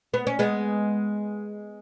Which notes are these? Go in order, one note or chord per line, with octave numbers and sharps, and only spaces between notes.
B3
C#4
G#3 B3